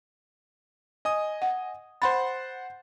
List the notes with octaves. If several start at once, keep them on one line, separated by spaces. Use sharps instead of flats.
D#5 G#5 D#6
F#5
C5 F#5 B5 C6 A6